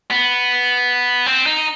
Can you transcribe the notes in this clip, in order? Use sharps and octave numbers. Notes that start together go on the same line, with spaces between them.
B3
C4
D#4